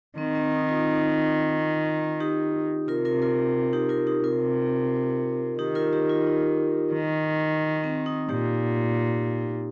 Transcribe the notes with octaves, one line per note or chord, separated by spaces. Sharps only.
D#3 C4
C4
D#4
F4
D#4 G4
C3 F4 A#4
F4 A#4
F4 A#4
D#4 G4
F4 A#4
D#4 G4
C3 F4 A#4
D#3 D#4 G4
F4 A#4
D#4 G4
F4
D#4
D#3
C4
D#4
A#2 D#4 G4